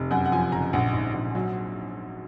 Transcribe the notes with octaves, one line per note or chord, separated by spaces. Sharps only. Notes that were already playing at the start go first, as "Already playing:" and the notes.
Already playing: F1
F#2 F#5
F#5
F3 G#5
F#1 A#5
A#1 F#5
G#2
A#1
F#3